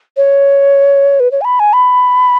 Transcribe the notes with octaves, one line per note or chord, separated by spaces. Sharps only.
C#5
B4
C#5
G#5
B5
G#5
B5